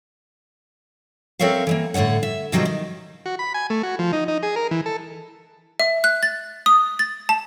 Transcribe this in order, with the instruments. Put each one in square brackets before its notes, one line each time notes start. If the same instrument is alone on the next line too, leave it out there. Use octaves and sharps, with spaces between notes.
[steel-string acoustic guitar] C4 A4 A#4 C#5 E5 F5
E3 G#3 A#3
A2 D3 A3 C#5 F#5
E5
B2 D#3 F#3 G3 C4 F4
D#3
[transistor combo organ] F#4
B5
G#5
A3
F#4
F3
D#4
D#4
G#4
A#4
E3
A4
[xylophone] E5
F#6
A6
D#6
A6
A5